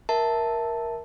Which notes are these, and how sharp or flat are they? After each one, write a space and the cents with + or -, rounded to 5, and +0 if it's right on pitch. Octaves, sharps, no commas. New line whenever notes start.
A#4 +10 E5 -10 A5 +0